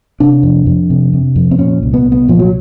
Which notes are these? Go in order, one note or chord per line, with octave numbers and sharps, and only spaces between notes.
C3 D4
F2
F2
C3
C3
F2
C4
A#2 C#4
C2
B3
C2
B3
A#2 F3
F#3